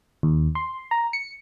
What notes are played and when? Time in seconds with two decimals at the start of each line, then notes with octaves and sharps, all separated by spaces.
0.23 D#2
0.55 C6
0.91 A#5
1.13 C#7